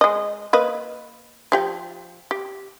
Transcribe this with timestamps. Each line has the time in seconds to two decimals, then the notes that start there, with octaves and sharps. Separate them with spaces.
0.01 G#3 D#5
0.53 A#3 B4 D#5
1.52 F3 G4 G5
2.31 G4